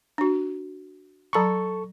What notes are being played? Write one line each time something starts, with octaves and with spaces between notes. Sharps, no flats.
D4 F#4
F#3 A4 A#5 B5 C#6